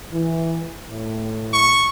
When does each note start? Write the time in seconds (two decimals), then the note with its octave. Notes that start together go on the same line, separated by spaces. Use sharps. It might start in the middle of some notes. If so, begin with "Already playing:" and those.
0.13 E3
0.90 A2
1.53 C#6